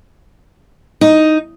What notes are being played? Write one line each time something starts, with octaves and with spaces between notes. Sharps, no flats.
D#4